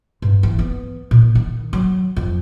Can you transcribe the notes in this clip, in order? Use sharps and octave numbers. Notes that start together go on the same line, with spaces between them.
G2
E3
B3
A#2
D#3
F#3
F2